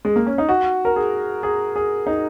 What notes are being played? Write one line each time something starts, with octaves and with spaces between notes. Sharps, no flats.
G#3
A#3
C#4
D#4
F#4
A#4
G#4
G#4
G#4
D#4